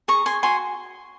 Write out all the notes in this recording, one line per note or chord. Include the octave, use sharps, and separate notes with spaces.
G#4 A#5 C#6
G#4 G#5 C6
F#4 G#5 C6